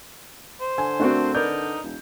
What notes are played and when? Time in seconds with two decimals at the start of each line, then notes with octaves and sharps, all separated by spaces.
0.61 C5
0.78 D3 G#5
1.00 A3 C4 D4 F#4 A#4
1.35 D#4 A#4 B4 D5 G6
1.84 E1